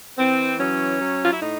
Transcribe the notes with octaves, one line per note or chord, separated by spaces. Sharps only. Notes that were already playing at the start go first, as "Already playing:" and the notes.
E3 C4
F#3 C#4
F#3
F4
E4
A2 D#4